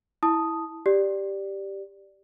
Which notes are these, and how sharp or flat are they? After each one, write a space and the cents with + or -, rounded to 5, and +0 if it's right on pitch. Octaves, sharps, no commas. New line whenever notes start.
E4 -10 A5 +0 D#6 +0
G4 +0 D5 +0